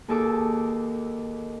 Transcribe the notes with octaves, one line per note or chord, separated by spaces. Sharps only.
D#2 G#4 A4 D6 E6